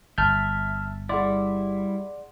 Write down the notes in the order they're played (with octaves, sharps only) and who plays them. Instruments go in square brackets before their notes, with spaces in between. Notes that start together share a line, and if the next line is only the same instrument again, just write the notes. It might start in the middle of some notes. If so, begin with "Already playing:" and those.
[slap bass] G1 [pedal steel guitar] E5 [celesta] A5 A6 [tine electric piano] F6 G6
[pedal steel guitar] G3 E4 [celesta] G#4 F#5 C6 [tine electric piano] D5